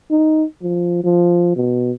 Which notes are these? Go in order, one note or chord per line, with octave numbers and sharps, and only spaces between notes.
D#4
F3
F3
B2